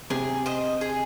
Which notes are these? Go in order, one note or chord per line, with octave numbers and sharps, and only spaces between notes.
C3 G#4
C5 D#5
G#4